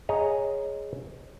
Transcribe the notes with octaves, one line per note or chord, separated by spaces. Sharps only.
G#4 C#5 D#5 A#5